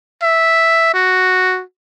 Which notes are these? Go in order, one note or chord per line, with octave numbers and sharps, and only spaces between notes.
E5
F#4